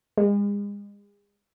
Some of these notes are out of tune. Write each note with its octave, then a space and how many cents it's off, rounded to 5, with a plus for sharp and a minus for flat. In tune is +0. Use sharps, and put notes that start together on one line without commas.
G#3 -40